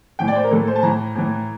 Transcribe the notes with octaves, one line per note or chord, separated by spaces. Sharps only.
A2 E3 G5
D5
C5
A#4
A2 E3 A4
C5
A5
A2 E3 A#5
A2 E3